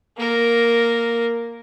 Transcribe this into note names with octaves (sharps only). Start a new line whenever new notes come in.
A#3 A#4